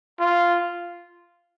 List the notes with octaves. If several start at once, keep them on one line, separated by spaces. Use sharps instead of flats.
F4